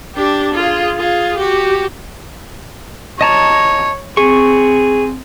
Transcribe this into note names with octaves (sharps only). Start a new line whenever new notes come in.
D4 G4
F4 G#4
F4 G#4
F#4 G4
C#5 D#5 A5 A#5
C4 G#4 C#6